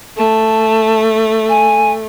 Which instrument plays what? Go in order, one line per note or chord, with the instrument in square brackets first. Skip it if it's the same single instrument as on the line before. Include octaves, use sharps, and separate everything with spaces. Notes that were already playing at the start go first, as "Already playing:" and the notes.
[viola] A3 [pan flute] A5
[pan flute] G#5